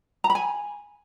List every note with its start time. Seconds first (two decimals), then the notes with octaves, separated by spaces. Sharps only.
0.24 A#5
0.30 B5
0.35 G#5